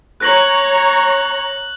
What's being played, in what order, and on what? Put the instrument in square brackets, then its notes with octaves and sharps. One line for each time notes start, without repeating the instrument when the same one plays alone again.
[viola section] C#5 A#5 [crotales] F#6 A#6 F#7